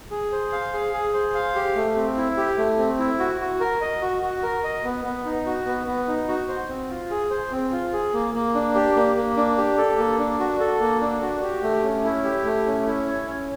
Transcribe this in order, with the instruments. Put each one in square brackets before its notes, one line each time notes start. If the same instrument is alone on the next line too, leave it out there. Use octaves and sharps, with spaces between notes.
[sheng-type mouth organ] G#4
C5
F5
G#4
G#4
C5
F5
G4
A3
C4
E4
G4
A3
C4
E4
F#4
F#4
A#4
D#5
F#4
F#4
A#4
D#5
B3
B3
D#4
F#4
B3
B3
D#4
F#4
C5
C4
F4
G#4
C5
C4
F4
G#4
A#3
A#3
D4
G4
A#3
A#3
D4
G4
A4
A#3
D4
F#4
A4
A#3
D4
F#4
G4
A3
C#4
E4
G4
A3
C#4
E4
C#5
C#4